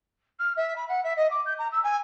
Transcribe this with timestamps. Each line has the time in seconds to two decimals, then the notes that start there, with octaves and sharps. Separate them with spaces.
0.39 F6
0.56 E5
0.76 B5
0.89 F#5
1.04 E5
1.16 D#5
1.30 D6
1.46 G6
1.58 A#5
1.72 E6
1.83 G#5